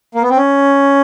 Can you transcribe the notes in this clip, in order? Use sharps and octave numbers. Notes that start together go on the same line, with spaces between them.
A#3
B3
C4
C#4